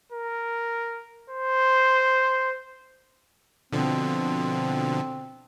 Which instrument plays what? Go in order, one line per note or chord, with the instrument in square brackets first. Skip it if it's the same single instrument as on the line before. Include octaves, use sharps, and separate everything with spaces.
[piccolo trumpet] A#4
C5
[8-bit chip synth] B2 D3 F3 [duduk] C4